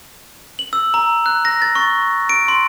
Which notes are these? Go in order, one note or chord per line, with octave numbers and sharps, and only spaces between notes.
F#7
E6
A#5
F#6
A#6
A6
C#6
D7
C6